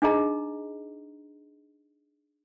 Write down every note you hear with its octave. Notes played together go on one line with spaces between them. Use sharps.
D4 D#4 G#4 D#5 A#5